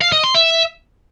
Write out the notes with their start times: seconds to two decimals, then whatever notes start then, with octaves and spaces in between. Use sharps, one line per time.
0.01 F5
0.12 D#5
0.24 C6
0.35 E5